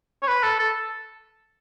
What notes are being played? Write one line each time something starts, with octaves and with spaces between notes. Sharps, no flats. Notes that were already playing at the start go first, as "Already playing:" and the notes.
C#5
B4
A4
A4